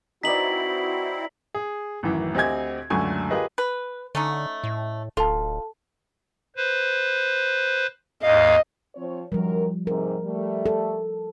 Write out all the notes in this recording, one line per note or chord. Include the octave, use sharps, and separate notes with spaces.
C4 D#4 E4 F#4 B4 D5 B6 F#7
G#4
A1 F#2 D#3 E3
D2 C4 G4 D#5 G#5 G#6
C#2 F#2 D3 A3 G#5 C#6
F4 G4 G#4 A#4 B4 D#5
B4
D3 A3 C#4 D#4
A2
D1 F4 A4 A5
B4 C5
D#2 G#2 D#5 F5
F3 C4 C#5
F#2 D#3 F3 G3 A#4
G#2 C3 A#4
G3 A3
A4